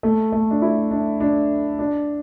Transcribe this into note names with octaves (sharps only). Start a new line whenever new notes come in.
A3
A3
D4
E4
D4
D4
D4